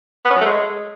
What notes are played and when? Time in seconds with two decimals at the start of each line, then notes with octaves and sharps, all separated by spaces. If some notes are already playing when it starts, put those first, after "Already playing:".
0.25 B3
0.30 C#4
0.35 F#3
0.41 A3
0.46 G#3